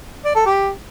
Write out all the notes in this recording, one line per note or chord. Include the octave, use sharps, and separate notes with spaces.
D5
A4
G4